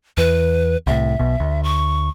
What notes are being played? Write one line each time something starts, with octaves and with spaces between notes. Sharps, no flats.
E2 B4
C2 A2 E5
B1 B2
D2
C#6